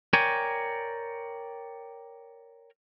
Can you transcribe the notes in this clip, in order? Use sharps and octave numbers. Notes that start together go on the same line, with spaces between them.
A#4 C#5 D5 G5 G#5